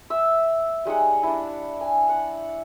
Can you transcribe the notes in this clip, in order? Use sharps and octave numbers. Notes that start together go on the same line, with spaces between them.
E5 E6
G3 G#3 D#4 F#5
D4 E4
G#5
F#5